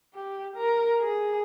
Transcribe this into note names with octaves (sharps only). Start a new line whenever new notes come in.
G4
A#4
G#4